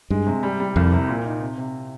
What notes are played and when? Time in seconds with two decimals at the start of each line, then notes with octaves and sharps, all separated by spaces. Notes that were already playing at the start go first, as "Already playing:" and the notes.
0.10 G2 G#3
0.26 C3
0.43 G3
0.60 G3
0.76 C2 F2
0.92 C3
1.09 A#2
1.25 D#4
1.41 C3
1.57 C3